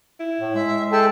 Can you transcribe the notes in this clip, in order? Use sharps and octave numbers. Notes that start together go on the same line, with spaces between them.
E4
A2
G#3 E5
G#4 A4 G5 A5 E6